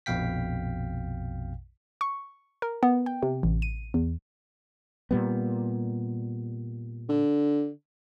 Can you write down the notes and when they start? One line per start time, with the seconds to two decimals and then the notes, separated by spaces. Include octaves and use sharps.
0.06 A#1 F2 B2 F5 G5 B6
2.01 C#6
2.62 A#4
2.83 B3
3.06 G5
3.23 C3
3.43 A1
3.62 D#7
3.94 E2
5.11 A#2 G3 B3
7.09 D3